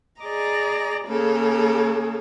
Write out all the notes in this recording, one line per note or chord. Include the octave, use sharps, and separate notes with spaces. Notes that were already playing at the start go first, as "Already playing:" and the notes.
G#4 D5 D#5 A#5
C#3 A#3 G#4 A4